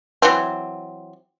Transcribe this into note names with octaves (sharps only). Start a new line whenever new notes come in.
E3 F#3 C4